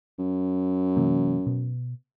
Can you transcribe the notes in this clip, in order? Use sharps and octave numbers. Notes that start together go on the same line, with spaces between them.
F#2
C3 E3 A#3
B2